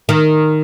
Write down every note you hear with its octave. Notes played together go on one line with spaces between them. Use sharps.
D#3